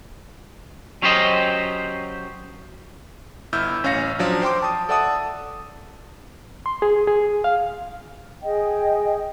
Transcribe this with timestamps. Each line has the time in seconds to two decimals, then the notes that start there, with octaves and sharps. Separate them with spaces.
1.02 F#3 C#4 G4 C5 D#5
3.53 G1 E4 E6 F6 G6
3.84 A1 C#4 C#5 F5 A#6 C#7
4.19 F3 F#3 D4
4.42 C5 G5 C6 D6
4.62 A5 D#6
4.89 A4 D5 E5 F#5 A5 D#6
6.66 C6
6.82 G#4
7.07 G#4
7.44 F5
8.43 G#4 D#5 G5